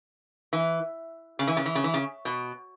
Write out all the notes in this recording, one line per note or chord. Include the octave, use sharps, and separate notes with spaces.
E3
C#3
E3
C#3
E3
C#3
E3
C#3
B2